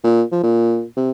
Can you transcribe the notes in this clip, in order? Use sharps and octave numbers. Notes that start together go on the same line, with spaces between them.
A#2
F3
A#2
C3